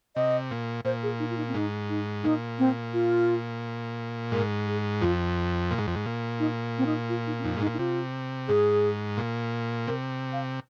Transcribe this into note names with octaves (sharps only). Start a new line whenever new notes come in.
C3 D#5
A#2
A#2 C5
G#4
D#4
F4
D#4
C4
G#2 D#4
D#4
A#2 D#4
C4
F4
G#2 A#4
G#4
F2 F4
A#2
G#2
F2
G#2
A#2
D#4
C4
D#4
F4
D#4
C4
F2 D#4
G#2 D#4
A#2
D#4
C3 F4
G#2 G#4
A#2
C3 A#4
F5